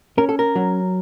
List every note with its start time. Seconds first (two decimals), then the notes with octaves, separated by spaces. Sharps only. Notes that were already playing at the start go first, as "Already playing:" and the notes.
0.18 C#4 A#4
0.29 A4
0.39 A#4
0.55 F#3